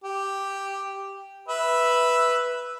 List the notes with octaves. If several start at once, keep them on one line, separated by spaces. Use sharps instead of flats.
G4
B4 E5